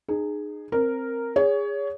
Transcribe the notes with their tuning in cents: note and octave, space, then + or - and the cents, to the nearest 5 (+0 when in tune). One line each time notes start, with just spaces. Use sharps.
D#4 -35 G#4 +0
C4 +10 A#4 -5
G#4 -20 C#5 +25